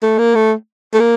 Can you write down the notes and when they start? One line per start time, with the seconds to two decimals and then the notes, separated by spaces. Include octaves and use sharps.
0.03 A3
0.19 A#3
0.35 A3
0.94 A3
1.00 A#3